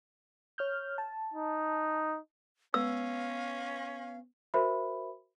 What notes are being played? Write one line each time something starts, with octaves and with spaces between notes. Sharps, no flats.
C#5 F6 G6
A5
D#4
B3 C#4 F5 E6
F#4 A#4 C5 E5 B5